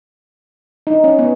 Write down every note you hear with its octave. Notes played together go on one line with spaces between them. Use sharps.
D#4
C#4
B3